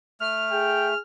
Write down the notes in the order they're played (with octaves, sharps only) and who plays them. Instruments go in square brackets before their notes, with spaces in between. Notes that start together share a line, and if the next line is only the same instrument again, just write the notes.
[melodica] A3 [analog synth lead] F6
[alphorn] G#4 [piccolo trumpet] G5